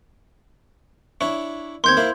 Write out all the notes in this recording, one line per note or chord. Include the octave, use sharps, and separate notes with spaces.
D4 E4 C#5
D#2 C4 C6 G6 G#6
A#3 E4 C5